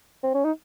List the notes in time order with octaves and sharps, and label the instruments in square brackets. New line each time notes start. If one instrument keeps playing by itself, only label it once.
[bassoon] C4
C#4
D#4